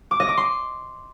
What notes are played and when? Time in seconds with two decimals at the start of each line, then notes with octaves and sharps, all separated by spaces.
0.11 D6
0.20 D#5
0.29 D6
0.37 C6